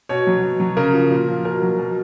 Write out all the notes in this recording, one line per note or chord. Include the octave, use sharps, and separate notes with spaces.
B2 C#5
F#3
B2
F#3
C#3 A#4
F3
A#2
F3
B2 A#4
F#3
B2